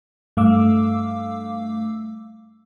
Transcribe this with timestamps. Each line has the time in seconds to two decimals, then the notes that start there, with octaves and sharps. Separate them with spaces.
0.37 G2 A3 F5 D6 E6